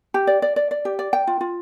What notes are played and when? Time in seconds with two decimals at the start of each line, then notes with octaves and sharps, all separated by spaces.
0.14 G4
0.27 D5
0.42 D5
0.56 D5
0.71 D5
0.85 G4
0.99 D5
1.13 G5
1.27 F4
1.41 F4